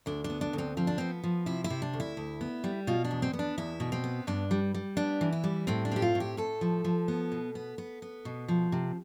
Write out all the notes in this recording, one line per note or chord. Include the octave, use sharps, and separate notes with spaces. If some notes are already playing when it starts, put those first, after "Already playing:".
D2 D4
D4
B3
D4
D2 C4
F3 C4
D4
B3 C4
F3
C3 E4
E4
C3
D4
D2
E4
D2
B3
G3
B2 F4
D4
E2
C4
B3
D4
E2 E4
B2
C4
B3
G2 D4
G3
G3
B3 D4
E3
E4
G3
A2 C4
D4
C4 G4
F4
A2
G4
A2 A4
F3
F3
B3
B2
B3
B3
B3
B2
F3
C3